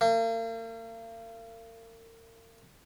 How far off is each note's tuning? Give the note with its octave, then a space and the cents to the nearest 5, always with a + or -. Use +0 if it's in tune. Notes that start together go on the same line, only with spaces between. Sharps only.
A#3 -40